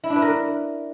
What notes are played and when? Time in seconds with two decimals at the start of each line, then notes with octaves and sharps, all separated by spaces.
0.04 E4
0.10 D4
0.16 B4
0.22 A#4